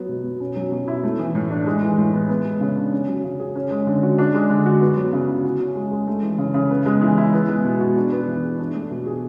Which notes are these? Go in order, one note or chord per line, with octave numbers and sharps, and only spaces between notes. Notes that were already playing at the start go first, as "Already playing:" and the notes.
Already playing: F#3 B3
B2
B2
C#4
F#3
B2
E4
A3
E3
A2
D4
G#3
E3
A2
B3
B3
G#3
C#3
D4
C#4
F#3
C#3
G#4
C#4
G#3
D3
F#4
D4
G#3
D3
F#4
B3
F#3
C#3
E4
F#4
C#4
G#3
G#3
A3
E3
C#3
C#3
B3
G#3
E3
E4
B3
G#3
B2
F#4
D4
B3
E3
G#4
D4
A3
B2
G#4